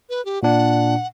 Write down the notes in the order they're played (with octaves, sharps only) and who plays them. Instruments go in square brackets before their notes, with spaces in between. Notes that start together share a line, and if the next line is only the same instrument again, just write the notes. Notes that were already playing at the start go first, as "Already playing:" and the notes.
[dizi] B4
G4
[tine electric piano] A#2 D4 [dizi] F#5